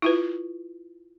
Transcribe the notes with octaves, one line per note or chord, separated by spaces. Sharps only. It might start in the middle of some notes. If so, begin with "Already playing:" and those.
E4 F4 B4